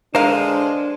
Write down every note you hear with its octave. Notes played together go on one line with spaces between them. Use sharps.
D3 E3 G#3 D4 A#4 C5 F5